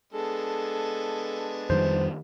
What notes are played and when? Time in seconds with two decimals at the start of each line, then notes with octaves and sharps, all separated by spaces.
0.13 G#3 B3 D4 A4
1.70 F2 D#3 G3 C5